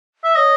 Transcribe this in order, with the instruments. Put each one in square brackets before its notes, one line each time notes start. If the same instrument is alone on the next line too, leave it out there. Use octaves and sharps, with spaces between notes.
[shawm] E5
[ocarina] C#5 [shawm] D#5